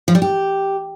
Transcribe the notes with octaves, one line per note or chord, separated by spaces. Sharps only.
F3
G3
G4